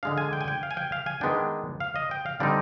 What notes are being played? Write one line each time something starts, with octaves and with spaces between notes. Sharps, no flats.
D3 G#3 D4 F5
G#5
G5
G#5
G5
F5
G#5
G5
F5
G#5
D#3 G#3 B3 D4 G5
F5
D#5
G5
F5
D3 G3 C4 D#4 D5